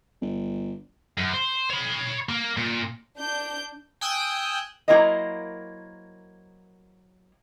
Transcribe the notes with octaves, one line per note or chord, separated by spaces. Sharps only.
G1
F#2
C5
C#5 B5
A#3
A#2
D4 G6
G5 G#5 D#6 E6 F#6 G6
F#3 A#3 E4 A#4 C5 D#5